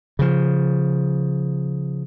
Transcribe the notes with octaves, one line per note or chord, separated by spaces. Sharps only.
C#3 F3